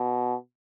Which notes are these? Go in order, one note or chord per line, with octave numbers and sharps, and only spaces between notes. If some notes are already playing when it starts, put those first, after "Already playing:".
Already playing: B2